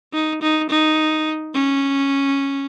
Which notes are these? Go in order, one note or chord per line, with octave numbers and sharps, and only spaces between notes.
D#4
D#4
D#4
C#4